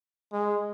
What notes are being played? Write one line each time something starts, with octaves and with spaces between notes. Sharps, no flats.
G#3